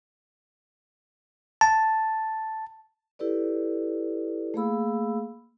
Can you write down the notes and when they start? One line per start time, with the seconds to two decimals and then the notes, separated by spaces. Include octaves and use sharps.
1.61 A5
3.19 E4 G4 A4 B4 D5
4.54 A3 A#3 G#4 F5 B5 E6